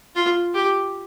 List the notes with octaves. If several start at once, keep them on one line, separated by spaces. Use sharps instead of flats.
F4
G4